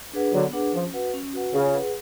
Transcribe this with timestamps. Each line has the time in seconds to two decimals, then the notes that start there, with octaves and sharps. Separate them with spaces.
0.13 D4 G#4 B4 F#5
0.33 D3 F#3 B3
0.53 D4 G#4 B4 F#5
0.73 F3 C#4
0.93 F#4 B4 F#5
1.13 C#4
1.33 F#4 B4 F#5
1.53 C#3 F4
1.74 G#4 B4 F#5